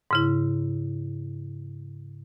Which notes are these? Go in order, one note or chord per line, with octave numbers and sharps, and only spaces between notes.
G#2 C#3 E4